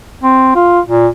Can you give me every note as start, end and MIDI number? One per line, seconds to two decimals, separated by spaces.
0.23 0.51 60
0.55 0.80 65
0.87 1.08 46